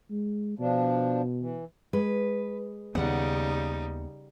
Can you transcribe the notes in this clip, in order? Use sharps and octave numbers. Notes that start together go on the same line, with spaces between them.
G#3
B2 F3 D4
E3
G#3 B4
D#2 C#3 G3 B3 D#4 F#5